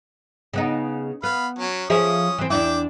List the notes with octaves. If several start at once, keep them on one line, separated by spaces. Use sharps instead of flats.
C#3 B3 D#4
B3 F5 B5
F#3 C#4
F3 C#4 G#4 E5 D#6
E3 C4
E2 D4 E4 G5 D6